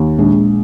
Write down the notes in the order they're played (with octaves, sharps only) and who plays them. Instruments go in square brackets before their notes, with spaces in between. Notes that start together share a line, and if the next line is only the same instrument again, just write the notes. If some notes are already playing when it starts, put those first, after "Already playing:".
Already playing: [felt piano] D#2
[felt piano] A#1 [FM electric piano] G#3